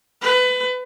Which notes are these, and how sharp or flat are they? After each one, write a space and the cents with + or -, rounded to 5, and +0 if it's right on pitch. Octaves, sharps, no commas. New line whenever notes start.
B4 +25